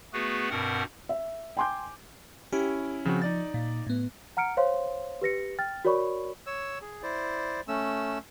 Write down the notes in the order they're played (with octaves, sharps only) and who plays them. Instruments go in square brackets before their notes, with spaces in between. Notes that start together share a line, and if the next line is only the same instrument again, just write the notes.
[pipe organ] A3 B3 F#4 G#4 B4
G2 B2 C4 A#4 F#5
[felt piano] E5
G5 G#5 C6 D6 G6
[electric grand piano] C#4 E4 [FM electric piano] G4
[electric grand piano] C#3 C4 F#4 [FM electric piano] F3
[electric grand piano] D#4 D5 A6
[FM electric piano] A#2
A2 B3
[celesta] F#5 A#5 F6 C#7 D7
C5 C#5 F5 C6
G4 B4 A#6 C#7
G5 F6 A6
F#4 A#4 C#5 D5 B5 C#6
[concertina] C#5 E6
G#4
E4 C5 D5
A3 C#4 E6